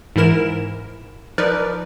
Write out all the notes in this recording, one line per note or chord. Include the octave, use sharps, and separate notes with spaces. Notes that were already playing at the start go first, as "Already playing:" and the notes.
G#2 E3 E4 A#4 E7
F3 D#4 A#4 B4 D5